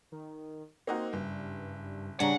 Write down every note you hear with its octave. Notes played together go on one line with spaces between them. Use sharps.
D#3
A#3 C4 D#4 F#4
F#1 G2
C#3 G3 D4 C#5 F#5 A#5